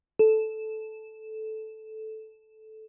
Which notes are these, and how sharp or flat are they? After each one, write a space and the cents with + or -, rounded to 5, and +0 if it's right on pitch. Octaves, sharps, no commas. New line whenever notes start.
A4 -10